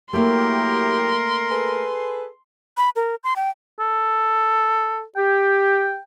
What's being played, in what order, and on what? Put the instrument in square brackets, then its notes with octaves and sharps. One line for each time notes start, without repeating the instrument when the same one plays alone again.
[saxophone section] F#3 E4 G4 [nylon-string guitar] A3 A#3 [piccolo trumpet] A#4 [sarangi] C6
[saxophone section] G#4 A4 B4
[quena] B5
A#4
C6
G5
[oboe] A4
[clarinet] G4 [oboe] G5